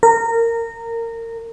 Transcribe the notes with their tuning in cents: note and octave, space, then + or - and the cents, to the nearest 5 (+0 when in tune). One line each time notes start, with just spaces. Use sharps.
A#4 -20